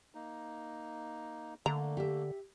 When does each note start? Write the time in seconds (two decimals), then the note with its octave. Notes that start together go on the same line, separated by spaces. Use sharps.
0.15 A#3 D#4
1.66 D3 A3 A#3 A#5
1.97 G4 E5